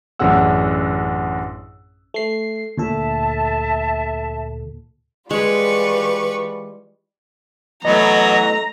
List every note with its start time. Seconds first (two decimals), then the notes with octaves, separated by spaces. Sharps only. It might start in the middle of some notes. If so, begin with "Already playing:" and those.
0.19 A1 F#2 D4 G#4 F#5 E6
2.14 A3 C7
2.77 D2 A#2 A4 E5 A5
5.31 E3 G3 G#3 F4 G#4 B4 C#6
7.85 E3 F#3 A3 B3 D#5 A#5